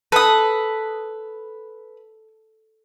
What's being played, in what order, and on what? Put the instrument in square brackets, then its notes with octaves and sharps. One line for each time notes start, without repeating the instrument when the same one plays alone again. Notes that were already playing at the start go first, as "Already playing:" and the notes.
[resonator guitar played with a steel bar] A4 [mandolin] B4 D#6